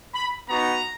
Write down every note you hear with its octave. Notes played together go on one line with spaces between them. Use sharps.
B5
B3 D#4 F#4 A#5